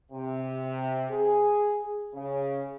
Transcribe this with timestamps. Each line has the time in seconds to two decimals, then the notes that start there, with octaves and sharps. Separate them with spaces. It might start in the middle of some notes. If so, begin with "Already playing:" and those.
0.12 C3
1.11 G#4
2.14 C#3